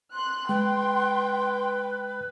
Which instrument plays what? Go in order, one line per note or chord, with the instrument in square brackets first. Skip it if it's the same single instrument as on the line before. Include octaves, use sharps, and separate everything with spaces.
[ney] C6 [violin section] F#6
[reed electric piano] G#3 [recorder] B4 [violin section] G5